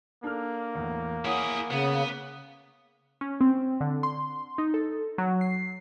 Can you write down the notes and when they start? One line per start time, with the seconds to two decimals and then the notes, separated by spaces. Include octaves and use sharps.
0.24 A#3 D4 A4 F6
0.75 E2 A2
1.25 E4 G#4 C#5 F#5 D#6
1.71 C#3 B3
3.21 C#4
3.41 C4
3.80 D3
4.03 C6
4.58 D#4
4.74 A4
5.18 F#3
5.41 C7